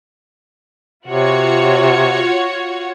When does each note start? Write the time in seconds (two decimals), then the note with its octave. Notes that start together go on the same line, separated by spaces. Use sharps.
1.07 C3 F4 F#4 C#5